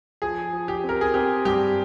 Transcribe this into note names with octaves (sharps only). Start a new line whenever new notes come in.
F3 G#4
F3
G4
C4
A#4
G#4
C4 G4
G2 G4